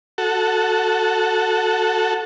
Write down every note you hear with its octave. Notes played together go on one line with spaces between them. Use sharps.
F#4 A4